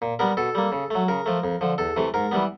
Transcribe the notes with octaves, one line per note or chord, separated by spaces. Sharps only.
A#2
G3 B3 A#4
B2 A4
G3 A#3
C#3
F#3 A3
C#3 A#4
F3 A3
F2
D3 F3
E2 A4
C3 E3 A3
G#2 A#4
E3 G3 B3